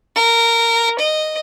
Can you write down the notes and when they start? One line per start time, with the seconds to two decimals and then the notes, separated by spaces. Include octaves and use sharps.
0.16 A#4
0.99 D#5